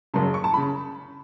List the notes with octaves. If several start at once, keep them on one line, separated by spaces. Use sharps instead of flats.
F#1 F#2 C#3 A5
C#6
A5
C#3 B5